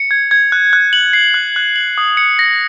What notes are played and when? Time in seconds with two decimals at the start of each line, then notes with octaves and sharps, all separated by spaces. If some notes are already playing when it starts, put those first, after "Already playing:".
Already playing: C#7
0.11 G#6
0.31 G#6
0.52 F#6
0.73 F#6
0.93 F#7
1.13 C7
1.34 F#6
1.56 F#6
1.76 F#7
1.98 D#6
2.17 C#7
2.39 A#6